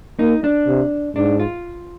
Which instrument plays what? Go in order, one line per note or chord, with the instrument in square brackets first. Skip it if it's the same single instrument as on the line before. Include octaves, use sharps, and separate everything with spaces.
[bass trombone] A#3 [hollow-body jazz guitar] D#4
[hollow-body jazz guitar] D4
[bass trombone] C3
[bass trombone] G#2 [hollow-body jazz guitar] D4
[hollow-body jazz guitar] F4